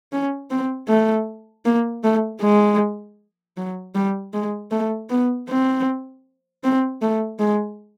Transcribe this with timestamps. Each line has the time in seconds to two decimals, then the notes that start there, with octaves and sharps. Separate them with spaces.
0.13 C#4
0.50 C4
0.88 A3
1.65 A#3
2.04 A3
2.42 G#3
3.57 F#3
3.95 G3
4.33 G#3
4.71 A3
5.10 B3
5.49 C4
6.64 C4
7.02 A3
7.39 G#3